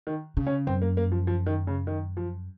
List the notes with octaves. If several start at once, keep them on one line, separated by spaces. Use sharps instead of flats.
D#3
C#3
C#4
F#2 C4
A#3
A#3
F3
F3
D#3
C#3
D#3
F3